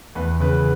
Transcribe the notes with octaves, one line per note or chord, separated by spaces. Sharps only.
E2 B4
C#3 B4